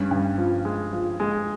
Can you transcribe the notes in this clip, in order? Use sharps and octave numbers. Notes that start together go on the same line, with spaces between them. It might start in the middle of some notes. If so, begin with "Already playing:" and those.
Already playing: G2 C#4
G2
F3
G#3
F3
G#3